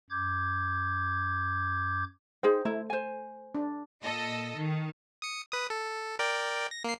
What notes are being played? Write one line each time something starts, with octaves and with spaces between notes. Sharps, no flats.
F#2 D6 G6 G#6
D#4 G#4 C5 G5
A3 E4
C5 G#5
D4
A#2 A4 D#5
D#3
D#6 C#7
B4 D#6
A4
A#4 D5 G5
A#6
A#3 C7